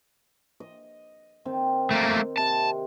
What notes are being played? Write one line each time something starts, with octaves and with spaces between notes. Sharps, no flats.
D#5
D#3 C4
A3 A#3
C3 A5